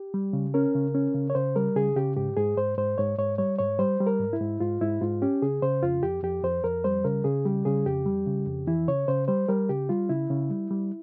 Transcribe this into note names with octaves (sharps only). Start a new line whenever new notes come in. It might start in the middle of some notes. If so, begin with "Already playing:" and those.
Already playing: G4
G3
C#3
C#4 A#4
C#3
C#4
C#3
C#5
C#3 C5
G3 A#4
C#3 G#4
C#3 G4
G#2 G4
G#2 G#4
G#2 C5
G#2 C5
G#2 C#5
G#2 C#5
G3 C#5
G#2 C#5
G3 C5
G3
A#4
G#2
E4
G#2
G#2 F4
G#2 E4
G#2 F4
C#4 G4
C#3 G#4
C#3 C5
F2 F4
F2 G4
F2 G4
F2 C5
F2 A#4
G3 C5
C#3 A#4
C#3 G#4
G3 G4
C#3 G#4
F2 G4
G3
C#3
F2
E3 E4
C#3 C#5
C#3 C5
G3 C5
G3 A#4
C#3 G4
G3 F4
C#3 E4
C#3
G3
G3